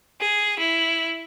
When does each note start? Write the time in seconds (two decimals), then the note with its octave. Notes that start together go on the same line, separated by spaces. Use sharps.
0.20 G#4
0.59 E4